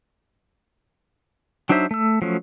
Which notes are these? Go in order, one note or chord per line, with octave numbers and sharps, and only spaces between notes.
F#3 D4 D#4 C5 E5
A3 E6
F3 F#3 A3 C#4